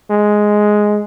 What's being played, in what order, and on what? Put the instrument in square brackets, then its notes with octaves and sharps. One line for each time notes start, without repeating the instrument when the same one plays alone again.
[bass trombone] G#3